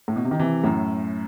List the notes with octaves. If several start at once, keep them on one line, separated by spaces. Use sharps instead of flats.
A2
B2
C3
D#3
C3 E3
F#2 A2